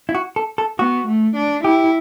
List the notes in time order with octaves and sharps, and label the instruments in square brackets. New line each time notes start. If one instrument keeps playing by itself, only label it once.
[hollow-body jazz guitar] E4
F#4
A4
A4
[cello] B3 [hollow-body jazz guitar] F#4
[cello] A3
D4
[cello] E4 [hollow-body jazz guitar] G4